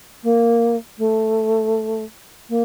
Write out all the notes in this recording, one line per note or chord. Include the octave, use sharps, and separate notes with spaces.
A#3
A3
A#3